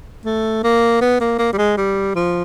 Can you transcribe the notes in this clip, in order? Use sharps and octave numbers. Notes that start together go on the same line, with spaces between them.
A3
A#3
B3
A#3
A#3
G3
G#3
G3
F3